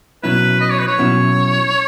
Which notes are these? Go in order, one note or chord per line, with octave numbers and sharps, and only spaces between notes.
B2 F#3 C#4 E4 B4
D#5
C#5
B4
C#5
B2 F#3 C#4 E4